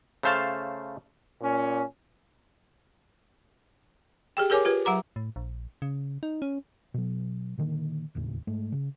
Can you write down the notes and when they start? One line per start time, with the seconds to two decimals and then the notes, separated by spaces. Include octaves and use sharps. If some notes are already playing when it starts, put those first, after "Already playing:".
0.23 C#3 A3 C5 F5 A5
1.41 A#2 C#4
4.37 G4 G#4 G5
4.50 G4 G#4 A#4 C#5 G#5 D6
4.65 F4 G4 B4
4.85 F#3 F#5 A#5 D6
5.16 A2
5.36 A#1
5.82 C#3
6.23 D#4
6.42 C#4
6.94 B2 F#3
7.58 A#2 D3 D#3 A#3
8.15 E1 D#2 A2 C#3
8.47 G#2 G#3 A3
8.72 C#3